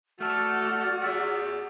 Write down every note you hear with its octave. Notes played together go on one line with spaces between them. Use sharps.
A3 F#4 A4 D5 A5 F6
G#4 E5 F#5